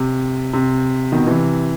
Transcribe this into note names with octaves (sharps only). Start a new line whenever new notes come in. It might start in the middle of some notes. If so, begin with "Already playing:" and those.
Already playing: C3
C3
B2 D#3
C3 E3